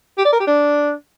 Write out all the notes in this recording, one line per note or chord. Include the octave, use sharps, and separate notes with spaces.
G4
D5
A#4
G4
D4